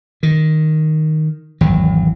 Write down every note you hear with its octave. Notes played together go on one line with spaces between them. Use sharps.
D#3
G#1 E2 F#3